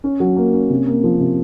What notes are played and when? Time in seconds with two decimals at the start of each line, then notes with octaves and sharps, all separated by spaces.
0.04 C#4
0.20 F#3
0.36 A#3
0.53 C#4
0.70 C3
0.86 A#3
1.04 F3
1.20 C3